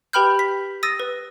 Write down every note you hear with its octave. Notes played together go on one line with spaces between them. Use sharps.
G4 B4 G5 B5 F6 G6
B6
D#6 E6 A6 A#6 D#7
B4